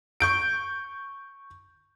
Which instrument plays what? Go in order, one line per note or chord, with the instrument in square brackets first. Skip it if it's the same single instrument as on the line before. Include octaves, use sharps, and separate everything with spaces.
[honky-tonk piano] C#6 G6 D7